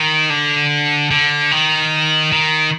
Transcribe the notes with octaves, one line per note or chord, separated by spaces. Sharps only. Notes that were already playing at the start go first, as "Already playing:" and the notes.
Already playing: D#3
D3
D3
D#3
D#3